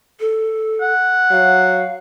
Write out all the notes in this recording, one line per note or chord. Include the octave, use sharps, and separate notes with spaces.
A4
F#5
F#3 F5